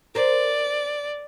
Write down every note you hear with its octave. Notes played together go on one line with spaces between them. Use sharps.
A#4 C5 D5